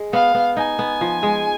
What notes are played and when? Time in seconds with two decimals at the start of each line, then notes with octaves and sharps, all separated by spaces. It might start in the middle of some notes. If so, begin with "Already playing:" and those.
Already playing: G#3
0.13 B3 F5
0.34 B3
0.56 D#4 G#5
0.79 B3
1.01 F3
1.23 G#3